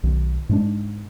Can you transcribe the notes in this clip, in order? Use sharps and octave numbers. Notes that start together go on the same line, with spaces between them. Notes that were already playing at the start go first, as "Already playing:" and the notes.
B1 D#3
G#2 G#3 D4